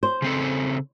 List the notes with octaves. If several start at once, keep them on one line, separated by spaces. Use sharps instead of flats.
C5
C#3 C4 A4